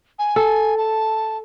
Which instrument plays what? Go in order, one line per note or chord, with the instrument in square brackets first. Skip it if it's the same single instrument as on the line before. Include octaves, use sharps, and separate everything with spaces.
[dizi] G#5
[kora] A4
[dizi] A5